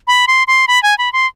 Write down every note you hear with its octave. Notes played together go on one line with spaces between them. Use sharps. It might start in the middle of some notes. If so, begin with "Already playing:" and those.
B5
C6
C6
B5
G#5
B5
C6